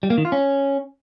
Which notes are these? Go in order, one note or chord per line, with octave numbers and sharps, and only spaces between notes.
G3
A#3
D#3
F4
C#4